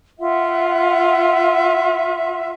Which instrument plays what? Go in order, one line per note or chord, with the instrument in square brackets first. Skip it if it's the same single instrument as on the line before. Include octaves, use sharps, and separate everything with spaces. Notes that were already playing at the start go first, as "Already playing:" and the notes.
[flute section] F4 E5 F#5